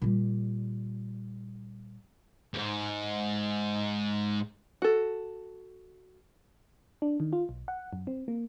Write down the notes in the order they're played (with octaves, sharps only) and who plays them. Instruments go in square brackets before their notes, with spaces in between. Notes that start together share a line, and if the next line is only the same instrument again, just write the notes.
[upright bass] A#2 G3
[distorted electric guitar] E2 G#2
[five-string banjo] F#4 A4
[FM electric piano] D4
D#3
F4
B1
F#5
F#2
C4
A#3